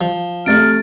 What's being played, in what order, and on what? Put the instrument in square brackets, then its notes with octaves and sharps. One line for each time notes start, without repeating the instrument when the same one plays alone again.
[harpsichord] F3
[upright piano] C3 A3 [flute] F6 [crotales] A6 D7